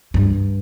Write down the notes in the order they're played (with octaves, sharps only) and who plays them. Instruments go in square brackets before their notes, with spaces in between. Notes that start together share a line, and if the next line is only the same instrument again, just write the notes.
[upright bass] G2